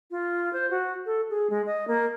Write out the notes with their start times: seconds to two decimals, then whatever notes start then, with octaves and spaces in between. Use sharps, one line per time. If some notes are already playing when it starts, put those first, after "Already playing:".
0.11 F4
0.53 C5
0.71 F#4
1.06 A4
1.30 G#4
1.50 G#3
1.66 D#5
1.88 A#3